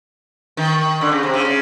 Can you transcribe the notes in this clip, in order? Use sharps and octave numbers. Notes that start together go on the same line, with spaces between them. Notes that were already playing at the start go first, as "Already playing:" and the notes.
D#3
D3
C#3
C3
C#3
C#3